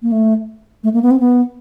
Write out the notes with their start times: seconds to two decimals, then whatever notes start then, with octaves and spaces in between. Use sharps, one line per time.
0.02 A#3
0.12 A3
0.84 A3
0.94 A#3
1.03 B3
1.11 C4
1.20 B3